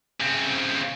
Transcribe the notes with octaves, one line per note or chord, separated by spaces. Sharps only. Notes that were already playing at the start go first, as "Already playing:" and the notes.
C#3 C4